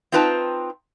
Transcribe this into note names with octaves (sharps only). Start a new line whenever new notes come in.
C4 D#4 F4 B4 G5 A5